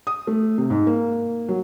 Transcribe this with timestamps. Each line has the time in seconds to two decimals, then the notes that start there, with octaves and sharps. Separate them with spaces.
0.07 D#6
0.27 A3
0.58 C3
0.70 G#2
0.87 A#3
1.49 F#3